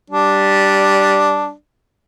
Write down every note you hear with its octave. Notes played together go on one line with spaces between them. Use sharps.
G3 D4